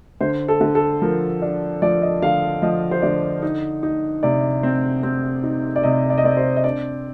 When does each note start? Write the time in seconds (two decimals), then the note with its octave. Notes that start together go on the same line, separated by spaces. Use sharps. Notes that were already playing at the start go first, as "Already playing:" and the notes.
0.21 D3 C5
0.48 A4
0.61 D3
0.75 A4
1.02 F3 A#4
1.42 D4
1.82 F3 D5
2.02 D#5
2.22 D3 F5
2.62 F3 D#5
2.91 C5
3.02 D3 D5
3.42 D#4
3.83 D#4
4.23 C3 D5
4.63 C4
5.03 C4
5.43 D#4
5.76 D5
5.83 C3 D#5
6.10 D5
6.18 D#5
6.24 C4 D5
6.37 C5
6.56 D#5
6.64 D4 D5